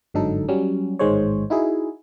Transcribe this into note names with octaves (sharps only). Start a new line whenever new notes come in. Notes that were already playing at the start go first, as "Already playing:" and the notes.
G1 G#2 D3 F#3 D#4 A4
F#3 G3 C#4
A1 G#2 D#3 G#3 C5 C#5
D#4 E4 F#4 G#4